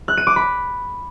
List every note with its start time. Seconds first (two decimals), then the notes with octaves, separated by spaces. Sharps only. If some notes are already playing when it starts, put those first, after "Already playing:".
0.08 F#6
0.17 D#7
0.27 D6
0.36 B5